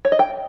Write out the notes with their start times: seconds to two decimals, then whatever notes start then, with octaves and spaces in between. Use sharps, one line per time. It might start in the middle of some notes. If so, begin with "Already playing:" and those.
0.05 C#5
0.12 D#5
0.19 G5